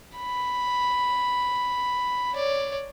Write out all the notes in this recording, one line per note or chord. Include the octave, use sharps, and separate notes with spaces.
B5
C#5 D5